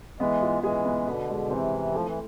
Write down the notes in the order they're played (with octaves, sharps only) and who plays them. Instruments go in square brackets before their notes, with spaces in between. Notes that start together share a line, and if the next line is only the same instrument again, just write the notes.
[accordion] E3 G#3 [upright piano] B3
[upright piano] F4
[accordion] E3 G#3 [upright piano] G#4
[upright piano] B3
[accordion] B2 D3 [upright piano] B4
[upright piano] G#3
[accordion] C3 E3 [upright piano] C4
[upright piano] E4
[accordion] F3 [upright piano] A3
[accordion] E3